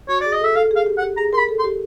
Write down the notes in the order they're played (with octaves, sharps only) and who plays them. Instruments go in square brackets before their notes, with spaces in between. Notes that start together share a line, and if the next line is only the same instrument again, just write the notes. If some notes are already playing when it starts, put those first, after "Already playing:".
[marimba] F#4 [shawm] C#5
[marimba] G#4 [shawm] D5
[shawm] D#5
[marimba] A4 [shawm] E5
[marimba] A4 [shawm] F5
[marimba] G#4 [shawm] F5
[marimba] G4
[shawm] F#5
[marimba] G4
[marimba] G#4 [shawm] A#5
[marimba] A#4 [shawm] C6
[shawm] B5
[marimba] A4
[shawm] C6
[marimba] G4